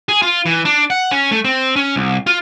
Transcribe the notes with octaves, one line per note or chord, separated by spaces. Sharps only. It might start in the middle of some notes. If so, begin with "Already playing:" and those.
G#4
F4
E3
D4
F#5
C#4
A3
C4
C#4
C2
F4